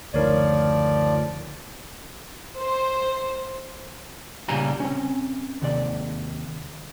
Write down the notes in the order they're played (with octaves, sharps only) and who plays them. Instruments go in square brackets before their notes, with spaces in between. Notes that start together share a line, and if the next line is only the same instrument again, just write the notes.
[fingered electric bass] F#1 D2 [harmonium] F3 D5 [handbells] D#4 A#4 C#5
[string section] C5
[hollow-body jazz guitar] A#2 C#3 G3 G#5 A#5
C4 C#4
D#2 C3 D5